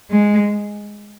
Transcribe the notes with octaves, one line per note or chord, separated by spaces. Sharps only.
G#3